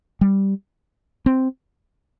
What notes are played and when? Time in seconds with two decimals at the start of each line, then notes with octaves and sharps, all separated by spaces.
0.21 G3
1.26 C4